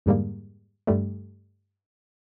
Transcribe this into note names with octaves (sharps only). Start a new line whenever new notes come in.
F2 G#2 D3 G3 G#3 A#3
G2 D3 G3 A3